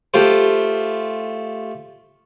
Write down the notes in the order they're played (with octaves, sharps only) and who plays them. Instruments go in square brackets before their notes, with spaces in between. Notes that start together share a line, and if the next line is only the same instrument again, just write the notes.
[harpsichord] A3 F4 G4 C5